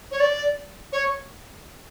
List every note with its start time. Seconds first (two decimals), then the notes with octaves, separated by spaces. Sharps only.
0.11 C#5
0.20 D5
0.92 C#5